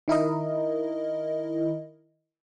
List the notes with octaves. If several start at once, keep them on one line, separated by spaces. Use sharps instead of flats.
D#3 E4 A#4 D#5